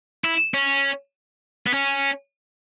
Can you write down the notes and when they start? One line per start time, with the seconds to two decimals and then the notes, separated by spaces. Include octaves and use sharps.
0.24 E4
0.54 C#4
1.67 B3
1.74 C#4